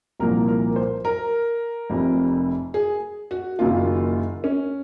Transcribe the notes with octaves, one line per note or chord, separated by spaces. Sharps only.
C2 A#2 F3 A#3 A#4
A#4
C5
A#4
F1 F2 C3
G#4
F#4
F#1 F#2 D#3 F#3 A#3 F4
C#4